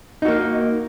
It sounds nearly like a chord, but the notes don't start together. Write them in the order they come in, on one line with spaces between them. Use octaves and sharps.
D#4 F#4 A#3